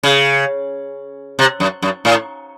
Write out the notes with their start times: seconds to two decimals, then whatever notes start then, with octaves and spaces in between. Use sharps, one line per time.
0.03 C#3
1.39 C3
1.60 F#2
1.82 F#2
2.05 A2